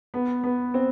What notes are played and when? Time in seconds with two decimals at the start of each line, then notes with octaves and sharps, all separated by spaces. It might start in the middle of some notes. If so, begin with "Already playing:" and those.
0.14 B3
0.44 B3
0.74 C4